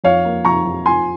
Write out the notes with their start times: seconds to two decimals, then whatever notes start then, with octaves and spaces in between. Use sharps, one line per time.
0.04 F2 C#5 F5
0.25 A#3
0.45 F2 A#5 C#6
0.66 F2
0.86 F3 G#5 C6